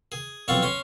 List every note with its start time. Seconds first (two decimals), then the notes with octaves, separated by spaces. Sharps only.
0.12 G#4
0.48 B1 F3 C4 A4 F5 C#6
0.62 C#4 C#5 C6